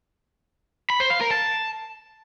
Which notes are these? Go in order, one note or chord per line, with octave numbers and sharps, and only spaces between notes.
B5
C5
F5
A#4
A5